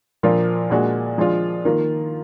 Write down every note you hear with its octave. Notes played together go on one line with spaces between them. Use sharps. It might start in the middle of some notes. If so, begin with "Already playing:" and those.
A#2 F3 A#3 D4 F4
A#2 G#3 D4 F#4
F3 G#3 D4 F4
D#3 A#3 F4